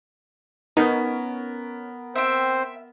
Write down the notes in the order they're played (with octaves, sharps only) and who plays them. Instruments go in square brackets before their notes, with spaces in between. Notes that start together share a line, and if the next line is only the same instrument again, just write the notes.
[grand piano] B3 A#4 [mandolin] C#4 [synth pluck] D#4
[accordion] C4 C5 [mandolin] E5 G5